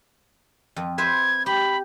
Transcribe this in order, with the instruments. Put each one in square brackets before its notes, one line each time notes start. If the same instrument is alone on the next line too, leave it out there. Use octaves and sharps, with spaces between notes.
[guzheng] F2
[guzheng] B4 C5 E5 [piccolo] G#6
[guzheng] G4 [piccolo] B5